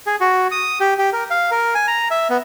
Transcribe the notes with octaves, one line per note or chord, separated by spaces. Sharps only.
G#4
F#4
D#6
G4
G4
A#4
F5
A#4
G#5
A#5
E5
B3